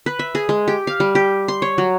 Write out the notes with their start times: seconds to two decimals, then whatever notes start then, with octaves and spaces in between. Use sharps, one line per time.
0.06 B4
0.19 E5
0.35 G#4
0.49 G#3
0.68 G4
0.87 F5
1.00 G3
1.15 G4
1.48 C6
1.62 C#5
1.78 F#3